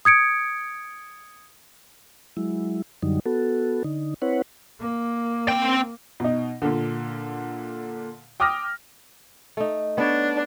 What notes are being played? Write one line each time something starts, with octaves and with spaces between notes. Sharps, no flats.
D#6 G#6 C#7 D7
F#3 G#3 E4
F#2 D3 F#3 G3 D#4
B3 F#4 A4
D3 D#4
C4 E4 B4 C#5 F#5
A#3
C4 G5
B2 D#4
A#2 D3
G5 D6 D#6 F6 A#6
A3 D#4
B3 D4 B4 C#5